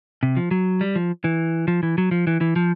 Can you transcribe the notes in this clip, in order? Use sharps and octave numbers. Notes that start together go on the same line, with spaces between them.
C3
F3
F#3
G3
F3
E3
F3
E3
F#3
F3
E3
E3
F3